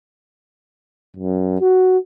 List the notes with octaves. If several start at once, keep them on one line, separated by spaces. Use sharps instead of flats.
F#2
F#4